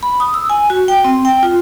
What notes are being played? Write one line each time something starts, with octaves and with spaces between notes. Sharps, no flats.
B5
D#6
E6
G#5
F#4
G5
C4
G5
F4